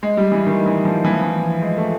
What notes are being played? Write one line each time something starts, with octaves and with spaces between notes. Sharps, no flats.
G#3
G3
E3
D#3
E3
F3
E3
F3
E3
G#3
A3